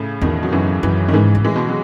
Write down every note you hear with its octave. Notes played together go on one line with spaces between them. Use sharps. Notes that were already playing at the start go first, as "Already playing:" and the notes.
Already playing: A2 C#3
E2 B2 D#3
F#3
F#2 C#3 E3
F#2 C#3 E3
D#3
G#2 C#3 E3
A2
E3 G#3
B2
F#3